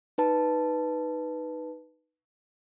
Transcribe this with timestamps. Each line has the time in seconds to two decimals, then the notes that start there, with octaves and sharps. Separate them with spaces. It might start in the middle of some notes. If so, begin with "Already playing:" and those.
0.18 D#4 B4 A5